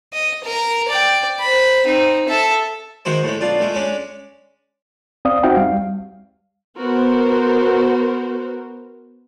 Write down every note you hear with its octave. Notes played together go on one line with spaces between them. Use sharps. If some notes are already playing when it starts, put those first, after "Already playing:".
D#5
A#4 A#5
D5 G5
C5 B5
C4 D#4
A4 E5
D#3 G#3 F#4 C5
A2 G#3
B1 D4 F4
G#3 A3
G#3 C#4 D4
C4 D5 F5 D#6
C4 D#4 F#4 E5 F#5 G5
G3 F5
B3 F#4 A#4 C5